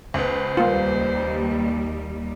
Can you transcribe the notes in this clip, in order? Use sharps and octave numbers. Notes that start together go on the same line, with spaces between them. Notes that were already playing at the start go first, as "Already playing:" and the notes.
C#2 B3 C5
D#2 G3 A#3 F4